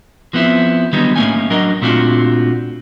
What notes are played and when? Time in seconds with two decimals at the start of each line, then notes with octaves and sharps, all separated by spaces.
0.33 F3 B3 C4 E4
0.93 D3 D#3 F#3 G3 B3 D#4
1.16 A2 A3 A#3 C#4 D#4 G#5
1.50 F#3 D4 A#4 D#5
1.82 A#2 A3 C4 D4 F4 F#4